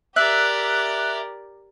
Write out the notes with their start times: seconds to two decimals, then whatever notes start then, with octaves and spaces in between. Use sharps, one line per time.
0.16 G4 A#4 D5 E5 F#6